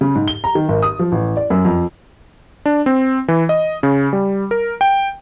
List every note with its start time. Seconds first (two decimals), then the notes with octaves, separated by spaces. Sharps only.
0.01 C#3
0.15 G#2
0.28 G7
0.44 A#5
0.55 D#3
0.69 G#1
0.82 D#6
0.99 F3
1.12 A1
1.37 D5
1.50 F#2
1.65 F2
2.66 D4
2.86 C4
3.28 E3
3.49 D#5
3.83 C#3
4.13 G3
4.51 A#4
4.81 G5